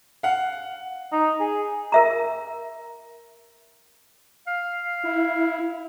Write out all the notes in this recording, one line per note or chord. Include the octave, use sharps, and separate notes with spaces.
F5 F#5
D#4
G#4
A#4 E5 A#5
F5
E4